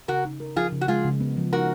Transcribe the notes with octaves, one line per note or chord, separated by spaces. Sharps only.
C#3 F#4 A#4
D#4
A#4
F3 F4 G#4
C#3
F#4
G#3 F4 G#4
C#3
B3
F3
D#4 F#4 A#4